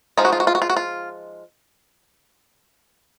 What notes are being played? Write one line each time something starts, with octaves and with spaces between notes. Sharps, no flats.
F3 G#3 D#4 F4
F#4
F4
F#4
F4
F#4
F4
F#4
F4